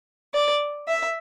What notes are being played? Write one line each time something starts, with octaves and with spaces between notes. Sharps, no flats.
D5
E5